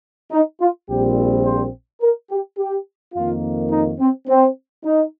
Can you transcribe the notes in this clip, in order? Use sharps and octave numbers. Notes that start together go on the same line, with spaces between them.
D#4
F4
A#1 A#2 G3 C4 G4
C5
A#4
G4
G4
F2 D#3 A#3 F4
D#4
C4
C4
D#4